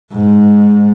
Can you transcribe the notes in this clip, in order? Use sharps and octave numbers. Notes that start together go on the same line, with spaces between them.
G#2